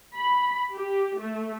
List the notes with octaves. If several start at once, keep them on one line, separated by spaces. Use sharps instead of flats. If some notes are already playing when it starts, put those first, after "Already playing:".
B5
G4
A3